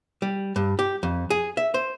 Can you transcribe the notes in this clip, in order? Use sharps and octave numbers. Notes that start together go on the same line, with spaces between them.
G3
G2
G4
F2
G#4
E5
C5